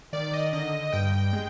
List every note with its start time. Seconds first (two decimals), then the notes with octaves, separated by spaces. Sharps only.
0.13 D#3 D5
0.33 D#5
0.53 D3 D#5
0.93 G2 G5
1.33 G#3